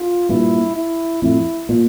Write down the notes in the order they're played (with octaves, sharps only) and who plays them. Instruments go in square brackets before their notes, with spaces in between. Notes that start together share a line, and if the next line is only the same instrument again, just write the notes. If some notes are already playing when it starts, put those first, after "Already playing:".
Already playing: [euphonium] F4
[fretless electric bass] G2 A#2 [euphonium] E4
[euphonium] E4
[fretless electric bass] F2 A2 [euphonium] E4
[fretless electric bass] A#2